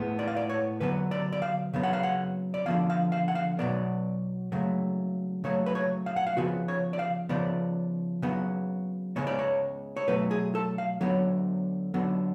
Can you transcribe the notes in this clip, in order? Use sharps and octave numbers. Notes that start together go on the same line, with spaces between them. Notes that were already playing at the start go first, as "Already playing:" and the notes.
Already playing: A2 G#3 B3
D5
F5
D5
C#5
D3 F#3 B3 B4
D5
D5
F5
C#3 F#3 B3
F#5
F5
F#5
D5
D3 F3 B3 F5
F5
F5
F#5
F5
B2 F#3 B3 D5
C#3 F#3 A3
C#3 F#3 A3 C#5
B4
C#5
F5
F#5
F5
C#3 F3 B3 F#4
C#5
D5
F5
C#3 F3 B3 D5
C#3 F#3 B3
C#3 G#3 B3 C#5
D5
C#5
C#5
B2 F#3 A3 B4
G#4
A4
F5
D3 F#3 B3 C#5
D3 F#3 B3